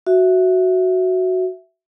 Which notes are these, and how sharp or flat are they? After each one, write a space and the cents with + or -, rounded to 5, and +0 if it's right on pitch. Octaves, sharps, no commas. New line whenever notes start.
F#4 +0 E5 +0